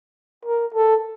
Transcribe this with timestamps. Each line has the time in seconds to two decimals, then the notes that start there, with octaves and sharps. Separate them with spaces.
0.45 A#4
0.75 A4